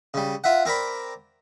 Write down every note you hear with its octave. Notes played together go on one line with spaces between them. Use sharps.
C#3 G3
F4 E5 F#5
C4 A#4 D5 B5